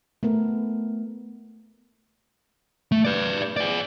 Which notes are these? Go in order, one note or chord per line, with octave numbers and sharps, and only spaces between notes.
A3 B3 A#4
A3
B4 D5
G#4 D5